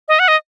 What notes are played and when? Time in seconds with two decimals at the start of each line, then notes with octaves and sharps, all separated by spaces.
0.08 D#5
0.19 F#5
0.28 D#5